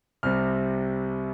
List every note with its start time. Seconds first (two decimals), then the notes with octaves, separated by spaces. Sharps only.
0.23 C2 C3 G3 C4 F6